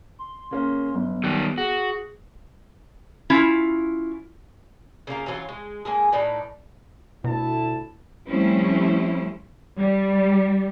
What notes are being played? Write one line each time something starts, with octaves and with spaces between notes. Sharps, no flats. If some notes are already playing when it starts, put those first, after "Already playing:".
C6
C#3 A#3 C#4
G1 F#3 B3
D#3 G3 F#6
F#4 G#4
C#4 E4 F4
C#3 A#3 F4 A#4
E3 F#3 C#4 F4
G#3
G#3 A#3 G#4
A2 D#4 B4 D5
D2 B2 E4 A5
F3 G3 A3 C4 C#4 E4
G3